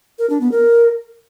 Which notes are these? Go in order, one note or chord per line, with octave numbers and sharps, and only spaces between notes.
A#4
D4
B3
A#4